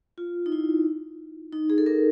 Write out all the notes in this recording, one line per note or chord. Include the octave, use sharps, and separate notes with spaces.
F4
D#4
E4
D#4
G#4
A4
A#4